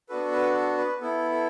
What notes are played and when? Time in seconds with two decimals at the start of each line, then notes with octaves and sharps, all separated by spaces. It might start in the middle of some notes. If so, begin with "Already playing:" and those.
0.09 B3 D4 F#4 A4 B4
0.32 B4
0.54 A4
0.77 B4
1.01 B3 E4 A4
1.31 A4